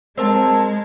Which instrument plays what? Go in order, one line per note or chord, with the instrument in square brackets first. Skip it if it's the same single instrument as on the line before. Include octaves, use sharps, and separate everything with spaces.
[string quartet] G#3 [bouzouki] C4 A#4 A5